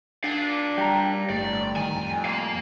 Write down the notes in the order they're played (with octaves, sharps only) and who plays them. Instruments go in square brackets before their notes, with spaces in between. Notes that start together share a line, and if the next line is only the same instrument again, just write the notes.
[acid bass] D4 [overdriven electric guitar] D5 F5
[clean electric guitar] G3 [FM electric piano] G5 A#5
[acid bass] G1 [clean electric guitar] A2 G3 [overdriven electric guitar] D5
[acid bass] D#3 [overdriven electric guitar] G#5
[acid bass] F2
[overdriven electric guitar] A#3 F5